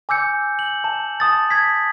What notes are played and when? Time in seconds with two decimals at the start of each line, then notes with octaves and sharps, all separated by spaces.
0.09 G#5 D6 E6 G6 C#7
0.59 F#7
0.84 A5
1.20 A5 D#6 A6
1.50 G#6 B6